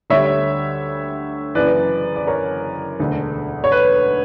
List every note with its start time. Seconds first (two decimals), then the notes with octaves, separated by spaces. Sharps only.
0.10 D2 D3 G3 C#5 E5
1.55 F#1 F#2 E3 B4 D5
2.16 D5
2.27 A#4 C#5
2.99 E1 D2 D3
3.64 C#5
3.72 B4